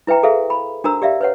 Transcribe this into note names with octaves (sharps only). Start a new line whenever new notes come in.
E4 B4 E5 G5 A#5
F#4 G#4 A4 C5 E5 F5
B5
D4 F#4 A#4 C5 A#5 E6
G4 D5 E5 F5
B4 C#5 F#5